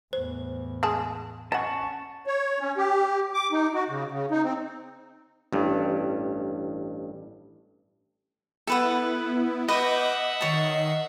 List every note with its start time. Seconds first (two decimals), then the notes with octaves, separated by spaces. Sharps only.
0.13 E2 A2 C5
0.83 G#3 G#4 A5
1.52 C#4 D#5 F#5 A5 C#6
2.27 C#5
2.60 C#4
2.77 G4
3.34 D6
3.52 D#4
3.74 F#4
3.90 C#3
4.12 C#3
4.31 D#4
4.44 C4
5.53 A1 G2
8.67 B3 E4 A4 B4 F#5
9.69 B4 D#5 E5 F#5 D6 G6
10.41 D#3 C#5 A5 C7